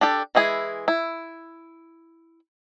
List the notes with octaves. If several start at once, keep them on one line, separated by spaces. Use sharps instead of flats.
D4 G4 A4
E3 G#3 E4 G#4
E4